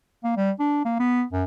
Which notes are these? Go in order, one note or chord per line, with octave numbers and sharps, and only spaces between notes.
A#3
G3
D4
A#3
B3
F#2